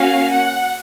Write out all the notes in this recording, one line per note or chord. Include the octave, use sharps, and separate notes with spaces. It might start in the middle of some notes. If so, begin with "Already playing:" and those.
Already playing: A#3 C#4 F#4 F5
F#5